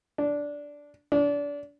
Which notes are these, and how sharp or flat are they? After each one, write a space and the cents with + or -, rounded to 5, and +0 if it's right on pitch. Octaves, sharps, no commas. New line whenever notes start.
D4 -10
D4 -30